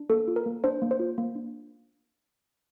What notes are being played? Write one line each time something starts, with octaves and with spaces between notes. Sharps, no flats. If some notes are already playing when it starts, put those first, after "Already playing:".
Already playing: D4
A#3 A4
F4
A#4
A#3
D4 C5
A#3
C5
F4
A#3
D4